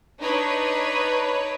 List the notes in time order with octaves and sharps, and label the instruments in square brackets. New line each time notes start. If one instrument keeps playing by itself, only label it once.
[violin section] D4 D#4 B4 C#5